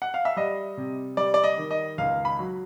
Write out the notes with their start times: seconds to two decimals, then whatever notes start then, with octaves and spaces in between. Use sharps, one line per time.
0.02 F#5
0.14 F5
0.25 E5
0.37 G3 D#5
0.77 C3
1.17 G3 D5
1.34 D5
1.44 D#5
1.57 D#3
1.71 D#5
1.98 C#2 F5
2.25 B5
2.39 F#3